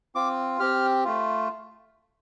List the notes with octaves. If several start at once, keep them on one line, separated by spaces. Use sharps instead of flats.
C4 F4 D6
C4 G4 F6
A3 F4